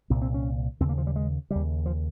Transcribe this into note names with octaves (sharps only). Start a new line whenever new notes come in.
C2 A#2 C4
C4
C#4
D#2 C#3 C4
A#3
F3
G3
G#3
D#2 C#3 G3
F3